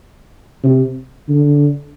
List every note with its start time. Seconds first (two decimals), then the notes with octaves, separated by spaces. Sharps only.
0.64 C3
1.29 D3